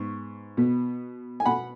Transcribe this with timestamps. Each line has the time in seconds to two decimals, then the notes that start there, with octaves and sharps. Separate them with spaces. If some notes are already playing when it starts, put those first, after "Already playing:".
Already playing: G#2 B3 C#6
0.57 B2 B3
1.40 G#5
1.46 B2 B3 F#5 B5